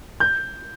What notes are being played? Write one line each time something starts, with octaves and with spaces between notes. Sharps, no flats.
G6